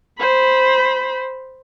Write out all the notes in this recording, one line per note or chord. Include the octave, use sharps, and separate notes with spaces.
C5 B5